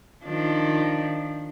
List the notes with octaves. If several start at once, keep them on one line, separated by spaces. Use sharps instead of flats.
D#3 F3 D4